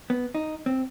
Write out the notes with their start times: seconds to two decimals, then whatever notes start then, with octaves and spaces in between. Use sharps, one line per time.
0.10 B3
0.35 D#4
0.66 C4